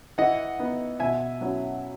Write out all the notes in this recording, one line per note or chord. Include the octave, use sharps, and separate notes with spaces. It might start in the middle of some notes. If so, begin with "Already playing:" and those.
E3 D#5 F#5
B3 D#4
B2 E5 G#5
F#3 C#4 E4